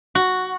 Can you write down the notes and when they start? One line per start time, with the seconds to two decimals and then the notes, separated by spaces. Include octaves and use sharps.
0.15 F#4